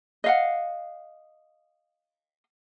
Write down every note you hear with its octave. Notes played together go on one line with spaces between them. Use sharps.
D#5 F5 F#5